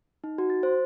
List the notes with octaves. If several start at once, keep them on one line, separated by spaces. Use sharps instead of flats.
D#4
F#4
A6
C5